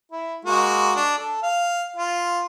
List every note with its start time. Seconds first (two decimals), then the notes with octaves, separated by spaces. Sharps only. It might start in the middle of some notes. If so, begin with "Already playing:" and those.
0.12 E4
0.45 G#3 A#3 F#4
0.96 D4
1.18 A4
1.43 F5
1.96 F4